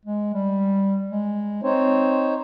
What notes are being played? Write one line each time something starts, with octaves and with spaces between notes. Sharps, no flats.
G#3
G3
G#3
C4 D#4 C5 C#5